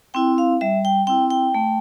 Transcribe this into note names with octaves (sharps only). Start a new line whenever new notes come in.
C4 E4 G5
F5
G3 E5
G5
C4 E4 G5
G5
A3